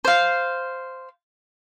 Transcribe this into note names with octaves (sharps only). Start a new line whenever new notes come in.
C5 F5